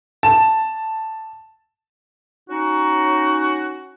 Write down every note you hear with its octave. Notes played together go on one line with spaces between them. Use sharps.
A5
C#4 D#4 F#4